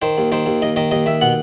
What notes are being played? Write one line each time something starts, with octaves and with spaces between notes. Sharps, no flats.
D#3 C5
D#2
D#3 C5
D#2
D#2 D#5
D#3 D#5
D#2 D#5
D#2 E5
B2 F#5